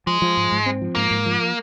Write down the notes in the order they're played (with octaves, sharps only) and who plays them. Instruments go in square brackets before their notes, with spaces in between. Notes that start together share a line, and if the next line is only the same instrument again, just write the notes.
[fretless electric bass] F3 [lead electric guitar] G#3
[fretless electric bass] F3
G#2
G#2
C4
F3
[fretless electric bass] G#2 [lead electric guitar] A#3
[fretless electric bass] G#2
F3